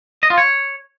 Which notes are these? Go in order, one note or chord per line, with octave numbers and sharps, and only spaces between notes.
D#5
F4
C#5